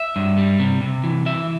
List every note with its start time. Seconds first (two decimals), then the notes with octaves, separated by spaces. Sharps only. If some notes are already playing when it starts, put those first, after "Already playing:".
Already playing: E5
0.16 G2
0.38 G3
0.60 C3
0.82 C3
1.04 E3
1.26 E3 E5